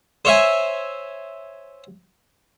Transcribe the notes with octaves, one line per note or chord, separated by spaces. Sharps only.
C5 C#5 E5 G#5